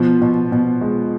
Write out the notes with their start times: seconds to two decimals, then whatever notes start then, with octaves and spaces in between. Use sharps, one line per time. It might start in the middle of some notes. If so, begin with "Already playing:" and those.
Already playing: B2 F3
0.21 B2
0.52 B2
0.81 G#3